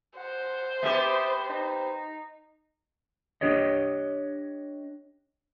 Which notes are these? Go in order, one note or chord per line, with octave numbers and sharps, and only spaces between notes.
C5 F#5
B3 C4 G4 E5
D#4
D4 G4 C#5 D#5